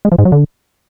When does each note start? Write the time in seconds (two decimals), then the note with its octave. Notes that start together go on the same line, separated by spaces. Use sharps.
0.05 G#3
0.12 F3
0.18 G#2
0.25 F#3
0.32 D3